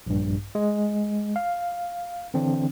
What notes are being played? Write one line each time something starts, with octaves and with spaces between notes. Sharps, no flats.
A#1 G2
G#3
F5
D3 E3 C4 D4